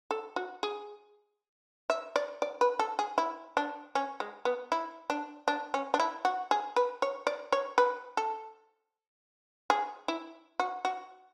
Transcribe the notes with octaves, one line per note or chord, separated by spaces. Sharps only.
A4
F#4
G#4
E5
D5
D5
B4
A4
G#4
E4
D4
C#4
G#3
B3
E4
D4
D4
C#4
D4
E4
F#4
G#4
B4
C#5
D5
C#5
B4
A4
G#4
E4
F#4
F#4